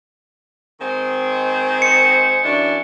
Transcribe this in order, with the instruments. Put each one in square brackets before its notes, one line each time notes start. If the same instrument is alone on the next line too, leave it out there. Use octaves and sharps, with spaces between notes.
[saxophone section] D#3 G#3 C4
[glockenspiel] C#7
[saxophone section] F#2 E3 D4